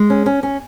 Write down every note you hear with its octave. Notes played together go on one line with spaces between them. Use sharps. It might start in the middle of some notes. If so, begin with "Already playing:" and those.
Already playing: G#3
C#4
C#4
C#4